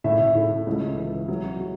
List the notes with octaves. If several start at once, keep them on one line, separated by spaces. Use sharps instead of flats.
A2 E5
A2
C#2
E3
F#3
F#3